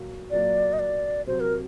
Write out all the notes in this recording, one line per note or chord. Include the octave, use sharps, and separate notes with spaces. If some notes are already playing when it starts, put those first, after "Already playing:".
Already playing: A#2 F#3 A#3
A#2 F#3 A#3 D5
D#5
D5
C3 F#3 C4 F#4 C5
A#4